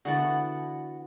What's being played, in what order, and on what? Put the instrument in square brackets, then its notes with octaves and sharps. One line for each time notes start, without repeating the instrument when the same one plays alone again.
[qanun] D3 E3 B3 [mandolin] F#4 F#5 A5